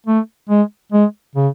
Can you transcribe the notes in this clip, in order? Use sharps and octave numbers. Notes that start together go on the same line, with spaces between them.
A3
G#3
G#3
C#3